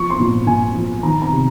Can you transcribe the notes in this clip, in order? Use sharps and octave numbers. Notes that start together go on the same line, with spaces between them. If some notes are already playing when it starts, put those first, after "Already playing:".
Already playing: F3 C#6
C6
A#2
A#2 G#5
F3
D#3 A#5
A#5
C3